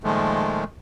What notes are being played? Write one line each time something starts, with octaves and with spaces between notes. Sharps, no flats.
A#2 D#3 F3 G#3 A3